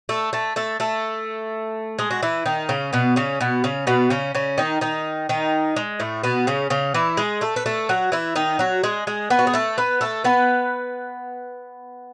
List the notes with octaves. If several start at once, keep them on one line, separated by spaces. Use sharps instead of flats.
A3 A4
A3 A4
A3 A4
A3 A4
G#3 G#4
F#4
E3 E4
D#3 D#4
C#3 C#4
B2 B3
C#3 C#4
B2 B3
C#3 C#4
B2 B3
C#3 C#4
C#3 C#4
D#3 D#4
D#3 D#4
D#3 D#4
G#3
A2 A3
B2 B3
C#3 C#4
C#3 C#4
E3 E4
G#3 G#4
A3 A4
B4
A3 A4
F#3 F#4
E3 E4
D#3 D#4
F#3 F#4
G#3 G#4
G#3 G#4
B3 B4
F#4
G#4
A3 A4
B3 B4
A3 A4
B3 B4